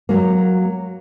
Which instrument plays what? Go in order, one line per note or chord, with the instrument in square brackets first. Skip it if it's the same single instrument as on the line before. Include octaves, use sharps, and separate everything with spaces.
[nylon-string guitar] F#3 A#3